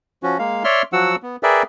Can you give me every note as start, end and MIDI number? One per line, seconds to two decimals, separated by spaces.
0.23 0.38 53
0.23 0.38 61
0.23 0.38 66
0.39 0.63 56
0.39 0.63 58
0.39 0.63 77
0.64 0.82 73
0.64 0.82 74
0.64 0.82 76
0.64 0.82 84
0.64 0.82 89
0.93 1.16 53
0.93 1.16 54
0.93 1.16 66
0.93 1.16 78
0.93 1.16 88
1.23 1.36 59
1.43 1.63 68
1.43 1.63 70
1.43 1.63 71
1.43 1.63 74
1.43 1.63 76
1.43 1.63 79